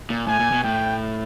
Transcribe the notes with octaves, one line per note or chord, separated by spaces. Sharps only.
A#2
A2 G#5
A#2
B2
A2 G5